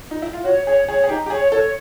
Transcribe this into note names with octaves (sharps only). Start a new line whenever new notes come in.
D#4
E4
F4
F#4 C#5
G#4 C#5
G#4 C#5
G#4
D#4 G4
G4
G#4 C#5
A4 C#5